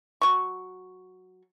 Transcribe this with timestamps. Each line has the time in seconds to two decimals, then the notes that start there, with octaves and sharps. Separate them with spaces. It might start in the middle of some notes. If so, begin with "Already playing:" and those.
0.21 F#3 C#6